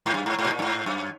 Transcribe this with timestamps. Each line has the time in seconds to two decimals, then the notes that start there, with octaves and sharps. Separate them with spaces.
0.06 G#2
0.14 F#2
0.26 G#2
0.39 G#2
0.45 B2
0.51 A#2
0.59 F#2
0.62 G#2
0.86 F#2